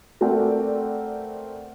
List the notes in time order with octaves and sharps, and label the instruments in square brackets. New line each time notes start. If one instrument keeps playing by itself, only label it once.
[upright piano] A3 C4 A#4 D5 F#5 G5